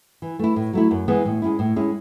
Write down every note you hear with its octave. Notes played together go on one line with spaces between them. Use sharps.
E3
A3 E4
A2
F#3 A3 E4
F#2
E3 G#3 B3 E4
A2
G#3 C#4 E4
A2
G#3 C#4 E4